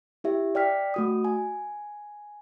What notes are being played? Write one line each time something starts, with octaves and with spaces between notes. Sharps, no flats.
E4 G4 E5
D5 G5 F6 B6
A3 F#4 D#6
G#5